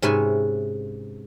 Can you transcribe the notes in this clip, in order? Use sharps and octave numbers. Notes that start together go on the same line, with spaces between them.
G#2 C3 C#4 B4 E5 G#5